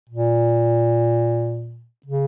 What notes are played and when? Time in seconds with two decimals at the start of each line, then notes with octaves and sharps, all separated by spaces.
0.10 A#2
2.06 C#3